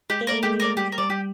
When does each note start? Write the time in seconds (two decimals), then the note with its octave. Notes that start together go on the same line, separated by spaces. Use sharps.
0.10 G#3 G4
0.21 A#3
0.27 A3 A#4 D5
0.43 G#3 G4
0.60 A#4 D5
0.77 G3 G4
0.92 A#4
0.98 G3 D5
1.09 G3 G4